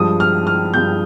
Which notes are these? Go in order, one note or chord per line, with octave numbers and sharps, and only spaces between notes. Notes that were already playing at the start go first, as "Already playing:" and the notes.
Already playing: G2 F3 G#3 D#6
F6
F6
G2 F3 G#3 G6